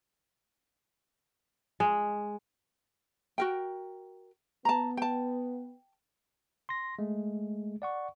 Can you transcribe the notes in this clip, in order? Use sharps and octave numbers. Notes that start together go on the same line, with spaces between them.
G#3
F#4 A#4 G5
B3 A5 A#5
G5 A5
C6 A#6
G#3 A3
D5 F#5 C#6